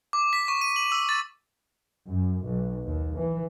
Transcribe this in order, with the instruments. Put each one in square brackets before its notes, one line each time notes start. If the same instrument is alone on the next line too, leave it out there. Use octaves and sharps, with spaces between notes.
[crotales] D6
B6
C#6
D#7
F#7
E6
A6
[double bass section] F#2
B1
D#2
E3